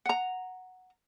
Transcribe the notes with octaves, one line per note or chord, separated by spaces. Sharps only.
F#5 A#5